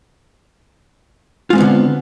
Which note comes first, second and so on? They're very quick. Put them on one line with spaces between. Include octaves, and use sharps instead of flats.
F4 G#3 C4 B3 D3